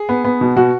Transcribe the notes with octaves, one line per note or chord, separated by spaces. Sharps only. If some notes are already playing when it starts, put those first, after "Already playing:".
Already playing: G#4
B3
B3
B2
B2 F#4